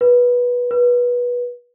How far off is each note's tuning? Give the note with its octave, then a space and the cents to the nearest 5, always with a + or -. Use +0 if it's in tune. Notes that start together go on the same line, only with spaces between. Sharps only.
B4 -15
B4 -20